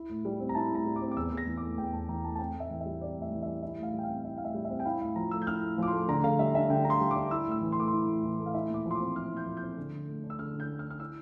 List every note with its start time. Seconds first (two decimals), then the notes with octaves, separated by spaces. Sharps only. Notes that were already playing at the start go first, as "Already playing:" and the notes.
Already playing: E4
0.09 A2
0.25 G3
0.40 C4
0.49 A#5
0.55 E4 A5
0.71 A2 A#5
0.86 G3
0.96 D6
1.01 C4
1.12 D6
1.16 E2 E6
1.32 E2
1.37 A#6
1.47 E3
1.57 D6
1.62 A3
1.78 E2 G5
1.93 E2 A5
2.08 E3 A#5
2.25 A3 A5
2.35 A5
2.39 C4 G5
2.54 A2
2.60 E5
2.70 E3
2.81 E5
2.86 G3
3.01 C4 D5
3.17 A2
3.22 E5
3.32 E3
3.43 G3 E5
3.63 E4 E5
3.77 A2
3.83 F5
3.93 G3
3.99 G5
4.03 C4 F5
4.24 E4 E5
4.38 A2 F5
4.45 E5
4.54 G3
4.65 E5
4.70 C4
4.80 G5
4.85 E4 F5
5.00 A2 F5
5.16 F3 A#5
5.31 A3 E6
5.42 G6
5.47 E4 F6
5.63 A2
5.78 F3 D6
5.88 A3 C6
6.08 D3 A#5
6.24 D3 F5
6.39 G3 E5
6.54 D4 E5
6.70 D3 G5
6.85 D3 A#5
6.90 C6
7.01 G3
7.11 D6
7.16 D4
7.31 E4 E6
7.47 A2 E6
7.62 E3
7.72 C6
7.77 A3 D6
7.88 E4 C6
8.08 A2
8.23 E3
8.39 A3
8.46 F5
8.54 E4 E5
8.70 A#2 D6
8.85 F3
8.91 C6
8.95 C4 D6
9.16 E4 F6
9.32 A#2
9.37 G6
9.46 F3
9.57 C4 G6
9.78 D3
9.93 D3
10.08 A3
10.23 D4
10.30 E6
10.39 D3 F6
10.54 D3
10.60 G6
10.69 A3
10.79 F6
10.85 D4
10.90 F6
10.99 E4 E6